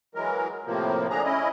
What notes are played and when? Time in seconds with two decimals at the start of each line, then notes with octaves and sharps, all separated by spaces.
0.15 E3 F#3 G#3 A#4
0.65 A2 C3 F3 A#3
1.10 D3 D4 G#4 A#5
1.24 C#4 E4 D#5